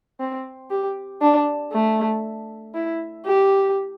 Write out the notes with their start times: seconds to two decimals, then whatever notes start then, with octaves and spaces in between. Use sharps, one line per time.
0.20 C4
0.70 G4
1.21 D4
1.72 A3
2.74 E4
3.26 G4